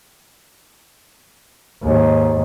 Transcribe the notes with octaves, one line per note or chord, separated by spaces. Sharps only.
D#2 G#2